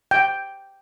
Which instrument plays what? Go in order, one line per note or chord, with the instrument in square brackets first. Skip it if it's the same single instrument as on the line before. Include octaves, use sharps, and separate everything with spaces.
[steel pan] G5